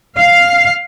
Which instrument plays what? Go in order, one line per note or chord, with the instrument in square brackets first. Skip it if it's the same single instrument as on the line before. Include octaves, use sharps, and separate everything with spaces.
[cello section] F5